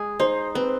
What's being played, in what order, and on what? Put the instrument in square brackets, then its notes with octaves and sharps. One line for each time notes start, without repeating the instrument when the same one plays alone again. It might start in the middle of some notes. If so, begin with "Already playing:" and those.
Already playing: [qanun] G#3 G#4
[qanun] D#4 [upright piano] C5
[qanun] C4 [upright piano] B4